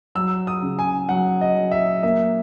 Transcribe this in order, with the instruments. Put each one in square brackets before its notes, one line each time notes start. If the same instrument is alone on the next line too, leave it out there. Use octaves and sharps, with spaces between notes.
[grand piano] F#3 E6
D#6
C#3
G#5
F#3 F#5
D#5
F#3
E5
A#3 E5